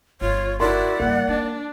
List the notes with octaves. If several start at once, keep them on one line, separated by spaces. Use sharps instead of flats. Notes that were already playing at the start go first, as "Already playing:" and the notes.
G1 F4 C#5
E4 F#4 A#4 D5 C6
G2 C#3 A#3 F#5
G#3 D4